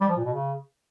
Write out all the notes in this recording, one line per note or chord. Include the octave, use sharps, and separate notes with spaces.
G3
F3
A#2
B2
C#3